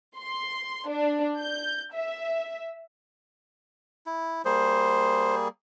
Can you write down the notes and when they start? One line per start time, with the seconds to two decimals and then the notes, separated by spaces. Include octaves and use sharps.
0.17 C6
0.89 D4
1.39 G6
1.93 E5
4.06 E4
4.45 G3 A#3 G#4 C5